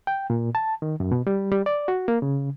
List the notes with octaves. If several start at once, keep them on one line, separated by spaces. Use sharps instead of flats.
G5
A#2
A5
D#3
F#2
B2
G3
G3
D5
F#4
A#3
C#3